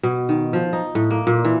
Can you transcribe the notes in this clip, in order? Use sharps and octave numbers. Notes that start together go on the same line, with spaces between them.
B2
D#3
F3
D#4
A2
A#3
A#2
E3